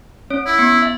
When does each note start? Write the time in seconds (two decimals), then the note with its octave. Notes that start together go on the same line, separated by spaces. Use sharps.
0.30 C#4 C#5
0.46 E4
0.59 B3
0.82 E5